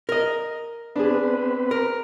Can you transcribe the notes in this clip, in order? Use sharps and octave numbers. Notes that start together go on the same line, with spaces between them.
A#4 D#5
B3 C4 D4 G#4 B4
A#4